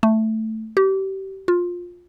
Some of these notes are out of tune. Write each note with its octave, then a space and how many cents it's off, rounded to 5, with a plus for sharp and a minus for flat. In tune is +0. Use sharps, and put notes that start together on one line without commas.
A3 +0
G4 -30
F4 +15